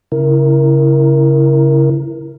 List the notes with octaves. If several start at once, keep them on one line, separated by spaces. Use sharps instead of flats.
C#3 E4 A#4